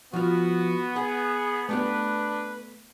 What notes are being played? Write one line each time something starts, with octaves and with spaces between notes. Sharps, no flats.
F3 B3 F4 F#4
G#4 F#5
A3 B3 D4 G4 B4